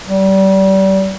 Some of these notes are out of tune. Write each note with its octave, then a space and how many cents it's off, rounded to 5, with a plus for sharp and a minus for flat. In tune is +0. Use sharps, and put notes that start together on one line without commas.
G3 -30